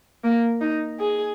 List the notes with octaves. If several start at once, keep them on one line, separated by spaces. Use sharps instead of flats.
A#3
D#4
G#4